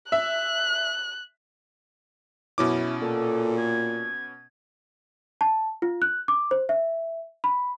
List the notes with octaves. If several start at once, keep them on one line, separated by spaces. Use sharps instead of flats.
E5 F#6
F#2 B2 C#4 E4 D6
A#2 A4
G#6
A5
F4
F#6
D6
C5
E5
B5